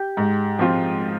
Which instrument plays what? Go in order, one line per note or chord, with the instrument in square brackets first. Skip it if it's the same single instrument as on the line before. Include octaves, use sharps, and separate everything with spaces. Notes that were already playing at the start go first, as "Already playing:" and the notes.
Already playing: [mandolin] G4
[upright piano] G#2
F3 C4 F4